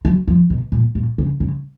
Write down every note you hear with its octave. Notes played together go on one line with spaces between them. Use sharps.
F#3
F3
B2
A#2
A#2
C#3
C#3